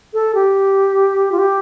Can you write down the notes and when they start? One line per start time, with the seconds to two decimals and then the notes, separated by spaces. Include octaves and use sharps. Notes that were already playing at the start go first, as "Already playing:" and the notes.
0.14 A4
0.35 G4
1.32 F4
1.39 G4